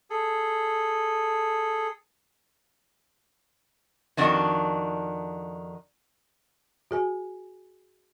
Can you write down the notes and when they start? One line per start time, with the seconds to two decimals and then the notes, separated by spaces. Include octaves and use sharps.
0.10 G#4 A4
4.17 F2 D#3 D4 F#4
6.91 F#4 G#4 G#5